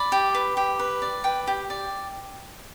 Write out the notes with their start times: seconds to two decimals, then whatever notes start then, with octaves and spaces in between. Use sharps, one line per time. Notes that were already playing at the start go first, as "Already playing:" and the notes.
Already playing: D5 B5
0.12 G4
0.35 B4
0.57 G4
0.79 B4
1.02 D5
1.24 B4 G5
1.47 G4
1.70 D5